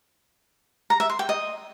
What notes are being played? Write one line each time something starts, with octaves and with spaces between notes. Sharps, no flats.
A#5
E5
C6
G5
D#5